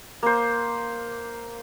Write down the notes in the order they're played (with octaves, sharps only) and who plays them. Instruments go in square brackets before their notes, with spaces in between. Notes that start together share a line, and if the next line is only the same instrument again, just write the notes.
[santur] A#3 C5